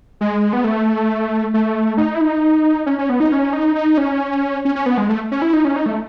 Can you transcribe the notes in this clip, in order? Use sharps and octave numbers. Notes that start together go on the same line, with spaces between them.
G#3
B3
A3
A3
D#4
E4
D#4
C#4
C#4
B3
D#4
C#4
D#4
D#4
C#4
C#4
C#4
B3
G#3
A3
C#4
E4
D#4
C#4
D#4
A3